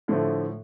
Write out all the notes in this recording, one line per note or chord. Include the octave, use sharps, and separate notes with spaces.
A2 D3 F3 A3